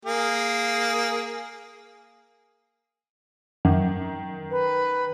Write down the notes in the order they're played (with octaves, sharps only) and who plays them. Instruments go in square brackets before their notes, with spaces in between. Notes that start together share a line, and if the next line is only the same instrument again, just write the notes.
[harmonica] A#3 G#4
[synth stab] F#2 [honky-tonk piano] D#3
[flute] B4